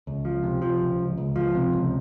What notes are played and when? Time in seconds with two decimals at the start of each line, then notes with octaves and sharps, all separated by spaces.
0.07 C#2
0.25 F3
0.43 C3
0.62 F3
0.81 C#2
0.99 C#2
1.18 C#2
1.36 F3
1.55 C3
1.73 C#2